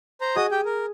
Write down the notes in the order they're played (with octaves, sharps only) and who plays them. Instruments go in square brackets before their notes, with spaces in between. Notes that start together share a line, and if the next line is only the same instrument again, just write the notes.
[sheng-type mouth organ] C5 A#5
[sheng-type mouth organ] F#4 D#5 D#6 [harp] G#4
[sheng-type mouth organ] G4 G5
A#4